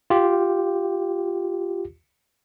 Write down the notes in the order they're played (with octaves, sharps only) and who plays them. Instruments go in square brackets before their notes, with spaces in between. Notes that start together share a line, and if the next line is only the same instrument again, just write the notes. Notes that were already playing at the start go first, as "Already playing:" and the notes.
[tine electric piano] F4 G4